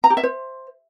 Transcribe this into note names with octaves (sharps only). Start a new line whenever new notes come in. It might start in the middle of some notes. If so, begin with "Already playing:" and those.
A#5
G4
E5
C5